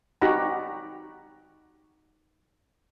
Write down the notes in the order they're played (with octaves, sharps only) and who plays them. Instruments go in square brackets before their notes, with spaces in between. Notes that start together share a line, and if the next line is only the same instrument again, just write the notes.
[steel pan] D#4 F#4 G4 F#5 A#5 B5